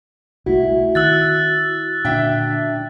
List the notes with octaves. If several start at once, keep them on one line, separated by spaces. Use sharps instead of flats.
C2 A3 E4 F#4
D#3 E6 F#6 A6
A#2 D3 D4 E5 G5